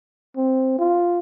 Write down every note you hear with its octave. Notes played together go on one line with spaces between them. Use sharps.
C4
F4